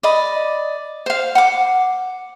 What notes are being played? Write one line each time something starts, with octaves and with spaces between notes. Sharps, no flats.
D5 D#5 B5
C5 F5
F#5 D6